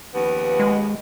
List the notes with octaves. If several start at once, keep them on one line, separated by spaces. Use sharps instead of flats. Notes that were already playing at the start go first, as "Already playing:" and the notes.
D#2 C#3 F3 B3 B4
G#3